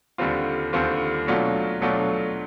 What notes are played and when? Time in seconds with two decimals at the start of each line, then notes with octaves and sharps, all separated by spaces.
0.18 D#2 D3 G3 C4 F4
0.73 D#2 D3 G3 C4 F4
1.27 B2 F#3 A3 D4 F4
1.82 B2 F#3 A3 D4 F4